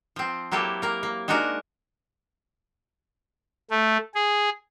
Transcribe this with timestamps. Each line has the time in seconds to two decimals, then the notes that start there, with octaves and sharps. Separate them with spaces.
0.16 F3 C4
0.52 F#3 A#3 E4 G4 A4
0.82 A#3 A#4
1.03 A#3
1.28 G#3 D4 D#4 F#4 A#4
3.71 A3
4.15 G#4